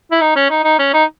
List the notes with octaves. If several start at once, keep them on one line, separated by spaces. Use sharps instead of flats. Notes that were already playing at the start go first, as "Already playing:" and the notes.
E4
D#4
C#4
D#4
D#4
C#4
D#4